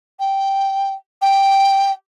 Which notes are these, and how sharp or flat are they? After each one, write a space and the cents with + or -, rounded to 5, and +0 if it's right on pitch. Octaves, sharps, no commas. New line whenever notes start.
G5 -5
G5 +0